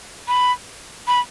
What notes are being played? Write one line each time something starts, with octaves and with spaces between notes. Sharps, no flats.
B5
B5